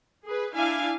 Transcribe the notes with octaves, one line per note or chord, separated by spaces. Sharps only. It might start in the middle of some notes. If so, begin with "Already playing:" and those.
G#4 B4
D4 E4 F5 G#5